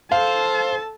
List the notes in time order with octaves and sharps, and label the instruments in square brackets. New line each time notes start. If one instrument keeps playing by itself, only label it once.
[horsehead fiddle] A4 A5 [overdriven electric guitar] C5 [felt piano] F5